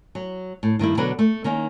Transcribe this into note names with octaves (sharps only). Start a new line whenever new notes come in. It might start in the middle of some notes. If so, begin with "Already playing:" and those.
F#3
A2
G2 D#3 A#3 E4
B2 D3 F#3 F#4 A#4 B4
A3
D#3 A#3 C#4 D#4